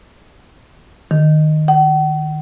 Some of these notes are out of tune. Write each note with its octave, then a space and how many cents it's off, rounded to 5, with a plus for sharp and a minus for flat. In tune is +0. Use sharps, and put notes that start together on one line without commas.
D#3 -20
F#5 +45